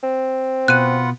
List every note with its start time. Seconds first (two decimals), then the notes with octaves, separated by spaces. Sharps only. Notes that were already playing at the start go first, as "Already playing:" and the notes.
0.03 C4
0.68 B2 F4 B4 F#5 F#6 D#7